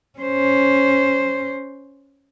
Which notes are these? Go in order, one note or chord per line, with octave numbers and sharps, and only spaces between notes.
C#4 C5